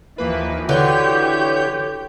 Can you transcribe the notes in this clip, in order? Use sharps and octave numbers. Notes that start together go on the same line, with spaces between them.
D#2 E3 F3 A#3 B4
D3 E3 F#3 G4 B4 C#5 G6